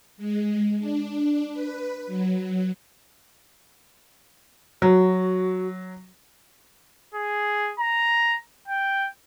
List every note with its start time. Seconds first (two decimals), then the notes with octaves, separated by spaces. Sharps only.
0.17 G#3
0.79 D4
1.53 B4
2.07 F#3
4.82 F#3 F#4
7.14 G#4
7.79 A#5
8.68 G5